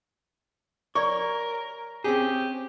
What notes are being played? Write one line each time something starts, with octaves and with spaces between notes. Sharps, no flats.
A#4 C#5 D5 C#6
C4 C#4 G4 G#4